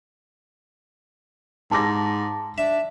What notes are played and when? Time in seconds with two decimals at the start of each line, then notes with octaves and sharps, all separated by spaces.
1.71 G#2 A5 D6 A#6
2.58 D4 E5